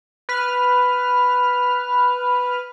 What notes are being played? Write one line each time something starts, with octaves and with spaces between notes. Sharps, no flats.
B4 F6